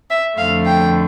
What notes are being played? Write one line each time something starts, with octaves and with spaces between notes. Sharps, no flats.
E5
F2 D3 F3 A3 F5
G5